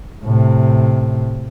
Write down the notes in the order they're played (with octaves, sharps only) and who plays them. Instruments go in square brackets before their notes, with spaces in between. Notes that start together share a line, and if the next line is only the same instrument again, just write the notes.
[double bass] A2 C3